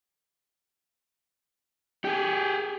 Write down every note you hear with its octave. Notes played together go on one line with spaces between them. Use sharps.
G4 G#4